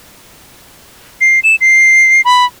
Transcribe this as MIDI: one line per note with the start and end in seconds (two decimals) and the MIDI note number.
1.21 1.40 96
1.44 1.55 100
1.61 2.21 96
2.25 2.45 83